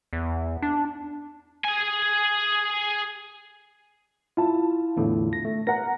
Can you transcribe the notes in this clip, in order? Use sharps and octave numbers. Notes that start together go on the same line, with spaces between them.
E2
D4
G#4 G#5
E4 F4 A5
E2 A2 D3
A#6
A3
A#4 F#5 A#6